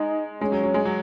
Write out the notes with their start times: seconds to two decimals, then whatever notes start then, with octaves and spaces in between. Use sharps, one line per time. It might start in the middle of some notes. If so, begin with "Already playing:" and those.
Already playing: G#3 D#4
0.41 G#3 C#4
0.52 F#3
0.63 F#3
0.74 G#3
0.85 F#3